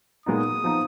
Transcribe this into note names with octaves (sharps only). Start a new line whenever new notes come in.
A#2 G#3 B3 D#4 D#6
F3 B3 D#4